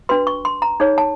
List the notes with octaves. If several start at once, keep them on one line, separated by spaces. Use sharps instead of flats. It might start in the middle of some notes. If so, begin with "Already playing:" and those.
D4 F#4 B4 C6
C#6
C6
A#5
D#4 G#4 C#5
A5